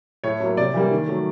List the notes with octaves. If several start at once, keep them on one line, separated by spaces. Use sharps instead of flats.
A2 C#5
F#3
A#3
C3 D5
E3 G3 A#3
D#3
F#3 A3